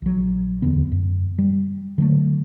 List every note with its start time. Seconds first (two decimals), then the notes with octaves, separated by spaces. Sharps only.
0.02 A#1 F#3
0.62 D1 E2 D3 B3
0.92 F#2
1.38 G3
1.98 D3 F#3 G3 A3